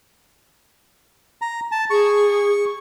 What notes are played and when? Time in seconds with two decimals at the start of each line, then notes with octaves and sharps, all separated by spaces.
1.42 A#5
1.72 A5
1.90 G#4 C#6